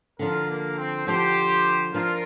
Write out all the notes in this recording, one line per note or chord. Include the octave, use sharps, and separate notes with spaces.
D3 F3 D4 F4 A#4
A#3
C4
D3 F3 D4 G4 C5
F3 D4 F4 A#4